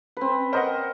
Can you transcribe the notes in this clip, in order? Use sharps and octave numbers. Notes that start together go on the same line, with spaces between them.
C4 B4
A#4 C5 D#5 F#5